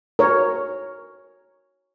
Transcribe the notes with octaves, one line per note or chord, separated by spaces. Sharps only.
A#4 C#5